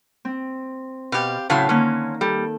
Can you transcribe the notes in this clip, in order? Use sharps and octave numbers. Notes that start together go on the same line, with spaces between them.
C4
B2 G4 F5
A2 C#3 F#3 A5 C6
D3 D#3 A#3 C#4 A#5
G3 A4